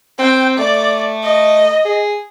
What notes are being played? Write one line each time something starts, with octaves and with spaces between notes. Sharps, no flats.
C4 G5
A3 D5
D#5
G#4